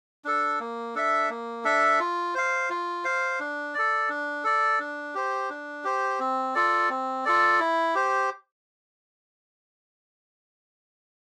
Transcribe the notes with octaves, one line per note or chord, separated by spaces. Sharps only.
D4 A4
A#3
D4 A4 E5
A#3
D4 A4 E5
F4
C5 F5
F4
C5 F5
D4
A4 D5
D4
A4 D5
D4
G4 C5
D4
G4 C5
C4
F4 A4 D5
C4
F4 A4 D5
E4
G4 C5